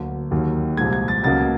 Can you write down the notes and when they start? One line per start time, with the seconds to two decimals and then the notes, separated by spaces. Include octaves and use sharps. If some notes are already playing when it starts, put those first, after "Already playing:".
Already playing: D2 D3 F#3 A#3
0.31 D#2 D#3 F#3 A#3
0.77 C2 A#2 F3 G#3 G#6
0.93 G#6
1.08 A6
1.23 C#2 B2 F#3 A#3 A6